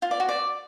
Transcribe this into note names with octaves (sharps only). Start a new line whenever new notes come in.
F4
D5
F#4
D5